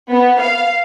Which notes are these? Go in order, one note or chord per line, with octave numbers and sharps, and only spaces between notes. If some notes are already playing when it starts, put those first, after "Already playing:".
B3
F5